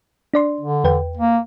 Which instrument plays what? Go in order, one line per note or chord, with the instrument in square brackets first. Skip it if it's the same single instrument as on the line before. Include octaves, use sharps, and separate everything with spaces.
[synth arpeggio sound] D4 D5 C6
[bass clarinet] D3
[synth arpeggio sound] E2 B4 G5
[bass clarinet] A#3